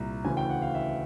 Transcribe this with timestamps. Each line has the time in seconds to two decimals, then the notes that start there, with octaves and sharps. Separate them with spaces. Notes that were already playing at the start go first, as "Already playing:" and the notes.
Already playing: C2 A#2 A#5
0.24 D2 C#3 E3 G#5
0.37 G5
0.49 F#5
0.62 F5
0.74 E5